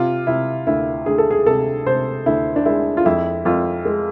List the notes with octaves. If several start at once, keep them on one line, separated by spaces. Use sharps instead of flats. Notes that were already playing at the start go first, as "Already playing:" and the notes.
Already playing: C3 F4
C3 E4
D2 E4
D2 G#4
A4
G#4
C3 A4
C3 C5
D2 E4
D4
G#3 E4
F4
F2 E4
F2 F4
G#3